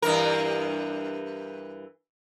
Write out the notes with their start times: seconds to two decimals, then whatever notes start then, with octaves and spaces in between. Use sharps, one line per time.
0.02 G2 E3 A#4